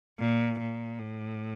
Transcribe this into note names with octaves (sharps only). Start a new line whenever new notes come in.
A#2
A#2
A2